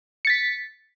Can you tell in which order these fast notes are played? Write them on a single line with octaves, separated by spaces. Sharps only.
C#7 A6 B6